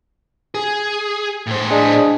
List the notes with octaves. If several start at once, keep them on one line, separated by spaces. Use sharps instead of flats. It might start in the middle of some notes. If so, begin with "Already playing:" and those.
G#4
A2 C5
D4 G#4 D#5